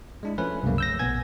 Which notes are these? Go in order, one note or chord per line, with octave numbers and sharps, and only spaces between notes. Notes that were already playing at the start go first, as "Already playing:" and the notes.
G#3 D4 E4
F3 A3 C#4 B4
C2 F#2 C#3 A3 A#3
E6 G6 A#6
A#1 B2 B3 G#5 G#6